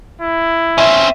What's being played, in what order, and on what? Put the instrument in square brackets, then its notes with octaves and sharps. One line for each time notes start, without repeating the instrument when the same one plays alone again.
[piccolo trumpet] E4
[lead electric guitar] C4 C#4 [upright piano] E5